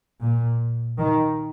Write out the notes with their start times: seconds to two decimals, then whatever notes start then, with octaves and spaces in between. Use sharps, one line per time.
0.20 A#2
0.98 D#3